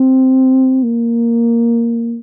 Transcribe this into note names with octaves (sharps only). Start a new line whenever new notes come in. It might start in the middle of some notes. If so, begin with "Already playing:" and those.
Already playing: C4
A#3